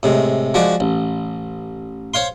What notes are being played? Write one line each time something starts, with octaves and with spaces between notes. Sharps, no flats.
A2 C3 G#3
F3 G#3 F#4 D5
A1
C5 C#5 F5 C6